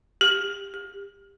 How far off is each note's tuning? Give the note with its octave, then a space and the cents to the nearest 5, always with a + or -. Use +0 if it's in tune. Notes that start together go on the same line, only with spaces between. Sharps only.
G4 +15
G4 +25